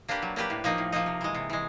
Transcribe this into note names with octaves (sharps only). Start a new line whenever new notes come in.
A#3 D4 G4 B4
F#3
A#3 D4 G4 B4
A2
F3 A#3 D#4
A2
F3 A#3 D#4
C3
E3 G#3
C3
E3 G#3